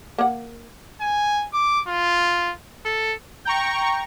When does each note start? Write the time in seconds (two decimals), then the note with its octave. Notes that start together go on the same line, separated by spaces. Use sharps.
0.18 A#3 F#5
1.01 G#5
1.54 D6
1.88 F4
2.86 A4
3.45 G5 A#5 C#6